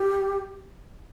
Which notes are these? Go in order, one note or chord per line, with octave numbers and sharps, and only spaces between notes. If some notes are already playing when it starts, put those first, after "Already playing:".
Already playing: G4